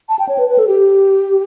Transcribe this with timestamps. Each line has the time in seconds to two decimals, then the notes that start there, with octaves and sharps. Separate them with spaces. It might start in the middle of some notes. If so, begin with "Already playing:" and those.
0.09 A5
0.19 G5
0.29 C#5
0.38 B4
0.49 B4
0.59 A4
0.68 G4